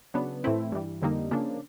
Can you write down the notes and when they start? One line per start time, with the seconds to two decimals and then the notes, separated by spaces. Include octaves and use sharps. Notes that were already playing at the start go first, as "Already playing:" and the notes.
0.14 C#3 F#3 B3 D4
0.44 A2 E3 A3 C4 E4
0.72 G2 E3 G3
1.02 F2 D3 G3 A#3 D#4
1.31 C#3 F3 A#3 D4